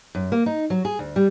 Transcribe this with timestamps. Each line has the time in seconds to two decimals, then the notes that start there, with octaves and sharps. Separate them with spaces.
0.15 F#2
0.32 A#3
0.46 D#4
0.70 F#3
0.85 G#4
0.99 D2
1.16 G3